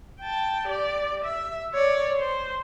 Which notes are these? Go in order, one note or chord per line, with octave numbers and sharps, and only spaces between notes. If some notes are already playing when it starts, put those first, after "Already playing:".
G5 A5
G4 D5
E5
C#5 D5
C5